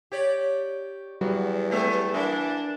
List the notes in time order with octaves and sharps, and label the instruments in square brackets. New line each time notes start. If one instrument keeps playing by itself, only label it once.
[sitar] G4 C#5 D5
[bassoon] E2 [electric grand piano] F#3 G3 F#4
[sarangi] A3 [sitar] B3 G4
[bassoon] E3 [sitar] A#3 [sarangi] D4